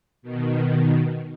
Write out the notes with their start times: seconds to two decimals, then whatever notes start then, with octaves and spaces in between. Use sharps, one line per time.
0.22 B2 D#3